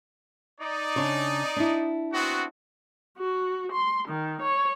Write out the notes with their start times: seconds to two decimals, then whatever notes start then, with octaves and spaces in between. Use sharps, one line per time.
0.60 D#4 D5
0.96 C#3 D4 C#5
1.56 D4 E4
2.13 B3 C4 F#4
3.18 F#4
3.73 C6
4.09 D#3
4.42 C#5